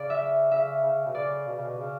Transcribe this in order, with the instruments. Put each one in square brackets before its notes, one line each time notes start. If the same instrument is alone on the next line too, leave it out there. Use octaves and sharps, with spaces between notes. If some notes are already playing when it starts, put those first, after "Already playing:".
Already playing: [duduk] C#3 [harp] D5
[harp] E5
[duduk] C#3 [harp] E5
[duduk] C#3
B2
[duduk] C#3 [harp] D5
[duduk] B2
C#3
B2
C#3